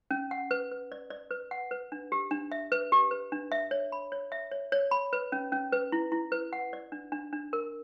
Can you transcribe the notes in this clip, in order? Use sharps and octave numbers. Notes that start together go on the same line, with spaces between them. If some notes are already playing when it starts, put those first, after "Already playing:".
C#4
F#5
B4
B4
D5
D5
B4
F#5
B4
D4
G4
D4
E5
B4
G4
B4
D4
E5
C#5
B5
C#5
E5
C#5
C#5
B5
B4
C#4
C#4
B4
E4
E4
B4
F#5
D5
D4
D4
D4
A#4